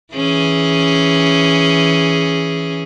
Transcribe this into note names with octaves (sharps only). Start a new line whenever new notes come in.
E3 C#4 G#4